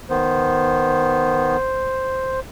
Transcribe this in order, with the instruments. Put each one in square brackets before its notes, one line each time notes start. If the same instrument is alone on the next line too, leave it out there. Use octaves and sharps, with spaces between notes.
[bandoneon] D#3 B3 [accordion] C5